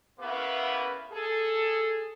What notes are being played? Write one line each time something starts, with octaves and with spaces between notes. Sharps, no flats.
C#3 A#3 B3 E4 B4
G#4 A4